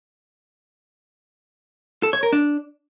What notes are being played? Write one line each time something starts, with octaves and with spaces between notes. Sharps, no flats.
A4
C#5
A#4
D4